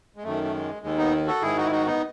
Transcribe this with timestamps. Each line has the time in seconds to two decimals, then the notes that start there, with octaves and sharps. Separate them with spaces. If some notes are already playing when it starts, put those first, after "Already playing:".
0.16 G#3
0.23 F#2 D#3 A3
0.43 A3
0.53 G#3
0.82 D#2 D#3 G#3
0.98 B3 D#4
1.27 F#4 A4
1.42 G#2 D#3 E4 G#4
1.57 D#4 F#4
1.64 E4
1.71 D#4 F#4
1.86 B3 D#4